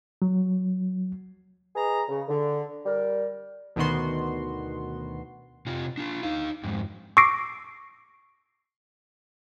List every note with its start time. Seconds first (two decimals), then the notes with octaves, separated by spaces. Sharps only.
0.22 F#3
1.74 G#4 B4 D#5 A#5
2.08 C#3
2.28 D3
2.85 G3 A#4
3.76 D2 B2 D#3 B3 F#4 C6
5.66 C3 F4
5.97 D4 F4
6.23 D#4 F5
6.63 F2 G#2
7.17 C#6 D6 E6 A#6 C7 D7